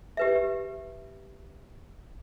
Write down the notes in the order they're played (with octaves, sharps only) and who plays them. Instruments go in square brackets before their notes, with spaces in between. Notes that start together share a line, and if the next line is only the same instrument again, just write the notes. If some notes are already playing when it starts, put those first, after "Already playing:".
[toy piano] G4 B4 E5